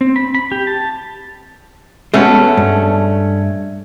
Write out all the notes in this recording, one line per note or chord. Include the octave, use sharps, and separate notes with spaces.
C4
B5
B5
G4
A5
G#3 A3 B3 C#4 F#4
G2